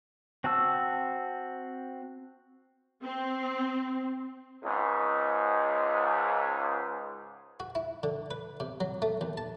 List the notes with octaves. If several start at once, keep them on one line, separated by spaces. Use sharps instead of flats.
C4 F#4 A5 E6
C4
C#2 G#2
F#4
E4
D3
B4
C3
F#3
A3
D#2
A5